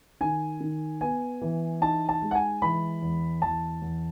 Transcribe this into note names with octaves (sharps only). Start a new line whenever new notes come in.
D#3 G#5
D#3
B3 G#5
E3
D#4 A5
A5
G#3
F#5
G#5
E3 B5
E2
E2 A5
E2